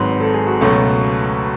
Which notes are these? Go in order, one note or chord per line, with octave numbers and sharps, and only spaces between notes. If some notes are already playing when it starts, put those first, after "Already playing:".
Already playing: G#1 G#2 F#3 B4
A4
G#4
F#4
C#2 B2 F#3 A3